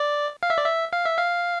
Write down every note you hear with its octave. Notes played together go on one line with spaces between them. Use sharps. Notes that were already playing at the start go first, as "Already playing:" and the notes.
Already playing: D5
F5
E5
D5
E5
F5
E5
F5